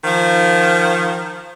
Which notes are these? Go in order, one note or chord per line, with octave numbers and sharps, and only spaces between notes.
D#3 F3